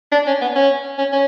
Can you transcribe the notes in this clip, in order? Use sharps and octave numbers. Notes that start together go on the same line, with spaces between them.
D4
C#4
B3
C#4
C#4
C#4